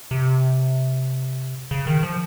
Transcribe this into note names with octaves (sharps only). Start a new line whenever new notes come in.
C3
C#3
D#3
F3